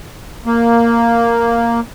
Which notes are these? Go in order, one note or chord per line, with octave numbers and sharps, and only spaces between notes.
A#3